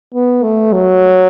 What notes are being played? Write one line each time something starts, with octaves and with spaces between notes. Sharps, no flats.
B3
A3
F#3